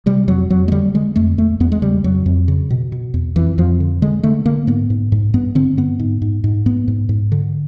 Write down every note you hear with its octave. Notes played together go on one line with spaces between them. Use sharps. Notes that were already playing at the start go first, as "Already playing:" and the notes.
C3 G3
F2 F#3
F2 F#3
G#3
D3 G3
D3 G#3
F2 A3
E2 A3
E2 B3
G#3
C#3 G3
F2 F#3
F2
C#3
B2
B2
E2
F2 E3
F2 F3
D3
D3 G#3
D3 A3
D3 A#3
G#2 B3
G#2
G#2
G2 B3
D3 C4
G2 B3
G#2
G#2
G#2
G#2 B3
G#2
G#2
D3